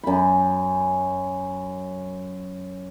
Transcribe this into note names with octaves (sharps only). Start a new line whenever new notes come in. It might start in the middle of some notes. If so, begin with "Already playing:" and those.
F#2 B5